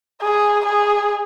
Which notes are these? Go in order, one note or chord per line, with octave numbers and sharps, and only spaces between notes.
G#4
G#4